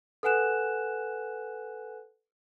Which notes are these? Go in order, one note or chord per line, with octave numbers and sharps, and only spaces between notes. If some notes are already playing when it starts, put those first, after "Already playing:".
A4 B4 F#5 G#5 F#6 E7